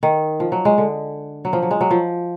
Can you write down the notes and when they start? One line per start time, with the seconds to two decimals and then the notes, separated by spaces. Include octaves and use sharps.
0.03 D#3
0.40 F3
0.52 F#3
0.65 G#3
0.78 D3
1.45 F#3
1.53 F3
1.62 F#3
1.71 G#3
1.81 F#3
1.90 F3